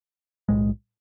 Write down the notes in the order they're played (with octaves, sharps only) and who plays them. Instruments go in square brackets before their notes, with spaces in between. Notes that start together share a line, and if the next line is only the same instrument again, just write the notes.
[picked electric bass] B1 A2 G#3